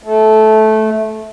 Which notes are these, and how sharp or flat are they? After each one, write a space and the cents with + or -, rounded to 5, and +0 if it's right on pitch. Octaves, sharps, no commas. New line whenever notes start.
A3 -15